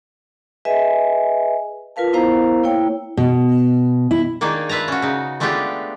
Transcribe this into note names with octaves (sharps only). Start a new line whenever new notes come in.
G#4 B4 D#5 E5 G#5
F4 A#4 B4 F5 A5
B3 E4 A#4 C5 F5 A#5
A#3 E4 C#5 G5
B2
E4
D#3 A#3 D4 D#4 G#4
F4 B4 E5 A5 A#5
C#4 F#4
C#3 D#4
G#3 A3 B3 D4 F4 G4